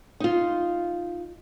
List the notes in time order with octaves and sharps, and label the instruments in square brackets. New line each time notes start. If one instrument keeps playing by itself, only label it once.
[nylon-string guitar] D#4 F4